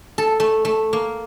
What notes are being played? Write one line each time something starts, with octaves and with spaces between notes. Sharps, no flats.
A4
A3
A3
A#3